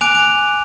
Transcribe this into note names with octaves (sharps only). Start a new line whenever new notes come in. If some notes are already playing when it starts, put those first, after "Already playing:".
G#5 D6 F#6 D7 F7
D7 F7